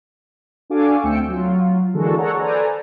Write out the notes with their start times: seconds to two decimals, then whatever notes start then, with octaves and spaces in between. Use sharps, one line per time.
0.70 D4 F#4 A4 F5 G#5 D6
1.03 D2 A3 C4 G5 E6 C#7
1.28 F#3 F4
1.93 D3 E3 G#3 A#3 F#4 A4
2.18 G#4 A4 C#5 D5 F#5 A#5
2.39 A4 B4 C5 D5 G#5 A#5